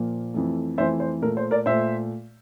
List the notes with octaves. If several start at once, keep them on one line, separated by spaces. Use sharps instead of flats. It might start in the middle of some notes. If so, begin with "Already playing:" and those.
Already playing: A#2 F3 A#3
F2 E3 A3
F2 E3 A3 C5 E5
C5
A#2 A3 A#4
C5
A#4 D5
A#2 A3 C5 E5